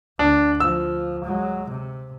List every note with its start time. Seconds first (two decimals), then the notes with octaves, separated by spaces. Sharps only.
0.19 D2 D4
0.60 F3 E6
1.25 F#3 G#3
1.70 C3